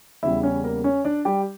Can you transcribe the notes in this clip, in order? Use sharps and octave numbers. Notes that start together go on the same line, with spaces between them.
E2 C#3 G3 E4 E5
C#4 C#5
A#3 A#4
C#4 C#5
D4 D5
G3 G4